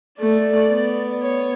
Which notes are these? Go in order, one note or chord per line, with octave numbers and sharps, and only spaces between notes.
A3 D5
B3
C#5